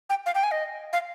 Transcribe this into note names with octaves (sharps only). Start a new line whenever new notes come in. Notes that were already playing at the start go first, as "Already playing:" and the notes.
G5
F5
G5
G#5
D#5
F5